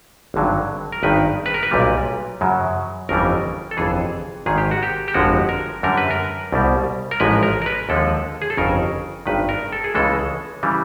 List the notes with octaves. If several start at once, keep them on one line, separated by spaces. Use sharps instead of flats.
G#1 G2 D3 F#3
A#4
G#1 G2 D#3 B4
B4
A#4
B4
B1 A#2 G3
F#2 C#3 F#3
G1 F2 C#3 E3 G3 A#4
A4
G1 F2 C3 E3 G#4
G#1 G#2 D#3 G#4
G4
F#4
G4
G4
G1 F2 D3 F3 G#3 F#4
A#4
F#2 D3 G3 A#4
B4
A#4
C2 B2 G3
A#4
A1 G#2 F3 G#3 B4
A#4
A#4
B4
D#2 D3 F3 G#3 A4
G#4
A4
G1 F2 C#3 A#4
G#1 G2 D#3 B4
A#4
A4
G#4
C#2 C#3 E3 G#3 A4
C#3 E3 G3